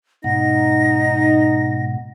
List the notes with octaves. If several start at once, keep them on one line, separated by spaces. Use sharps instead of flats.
G#2 B2 D#4 F#5 A#6